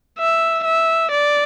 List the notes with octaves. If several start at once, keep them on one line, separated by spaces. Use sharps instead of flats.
E5
E5
D5